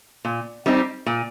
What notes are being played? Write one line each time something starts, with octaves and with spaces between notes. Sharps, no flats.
A#2
G3 C4 D#4 G4
A#2